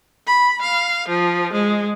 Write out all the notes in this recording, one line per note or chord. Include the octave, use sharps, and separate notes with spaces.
B5
F5
F3
G#3